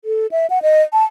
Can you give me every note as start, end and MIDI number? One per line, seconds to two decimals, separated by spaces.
0.05 0.27 69
0.31 0.46 76
0.50 0.59 78
0.62 0.82 75
0.93 1.04 81